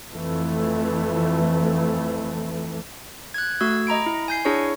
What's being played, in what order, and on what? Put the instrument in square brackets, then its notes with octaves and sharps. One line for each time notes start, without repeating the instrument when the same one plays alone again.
[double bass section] F2 E3 A3
[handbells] F#6 G#6
A3 F#4 E6 G#6
D#5 A#5 B5 D7
E4
G#5 G6 C7
D4 E4 G#4 C#5 C#6